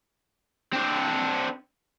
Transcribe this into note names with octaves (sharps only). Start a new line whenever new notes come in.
C4 D4